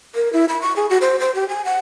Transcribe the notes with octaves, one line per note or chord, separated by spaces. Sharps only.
A#4
E4
B5
C#6
G#4
F#4
C5
C5
G4
G#5
F#5